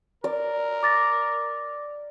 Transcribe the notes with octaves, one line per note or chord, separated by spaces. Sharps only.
A#4 D5
D6 A6 A#6